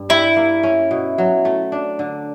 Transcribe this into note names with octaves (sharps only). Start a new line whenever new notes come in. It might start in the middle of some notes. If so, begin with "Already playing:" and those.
Already playing: G2
G3 E4
A#3
C#4
B2
F#3
A3
D4
D3